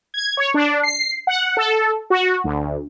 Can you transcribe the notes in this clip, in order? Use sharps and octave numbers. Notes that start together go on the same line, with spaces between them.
G#6
C#5
D4
C7
F#5
A4
F#4
D2